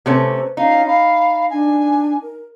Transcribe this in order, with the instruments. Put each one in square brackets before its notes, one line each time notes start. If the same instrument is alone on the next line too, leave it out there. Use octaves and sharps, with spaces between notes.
[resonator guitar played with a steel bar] C3 A3 C#4 [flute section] B4 C5
[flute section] C#4 F4 [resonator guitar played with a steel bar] D#4 [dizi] F5
[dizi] F5 [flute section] B5
[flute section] D4 [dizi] G#5
[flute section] A#4